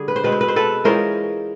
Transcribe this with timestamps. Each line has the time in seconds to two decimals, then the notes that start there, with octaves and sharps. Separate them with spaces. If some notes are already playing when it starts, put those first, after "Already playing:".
Already playing: D3 G3 G#4
0.08 B4
0.16 C5
0.23 B2 G#3 C4 B4
0.32 C5
0.41 B4
0.48 C5
0.56 A4 B4
0.84 E3 G#3 C#4 F4 A#4 C5